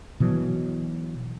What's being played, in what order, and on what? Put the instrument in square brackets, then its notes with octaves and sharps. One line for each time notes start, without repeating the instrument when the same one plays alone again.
[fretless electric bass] B2 E3 F#3